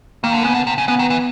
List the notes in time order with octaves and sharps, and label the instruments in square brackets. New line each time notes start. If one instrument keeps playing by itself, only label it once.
[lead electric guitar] D#3 [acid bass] A#3
[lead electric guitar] D3
[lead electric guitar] C#3 [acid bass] B3
[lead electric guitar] D3
C3
C#3
[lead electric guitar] C#3 [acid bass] B3
[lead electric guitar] D#3
E3